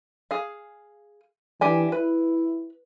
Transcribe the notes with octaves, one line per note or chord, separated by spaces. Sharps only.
G#4 F5
E3 D4 G4 G#5
E4 B4